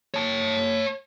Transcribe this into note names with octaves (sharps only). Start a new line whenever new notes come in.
C#5 A5